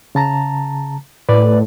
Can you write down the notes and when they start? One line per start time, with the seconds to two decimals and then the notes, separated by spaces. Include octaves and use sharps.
0.15 C#3 A5 A#5
1.29 A2 B4 D5